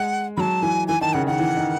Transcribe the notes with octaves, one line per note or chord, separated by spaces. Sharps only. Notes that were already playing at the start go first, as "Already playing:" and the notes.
Already playing: G#3 F#5
F#3 B5
A5
E3 G#5
E3 G#5
D#3 A5
C#3 F#5
D#3 F#5
E3
D#3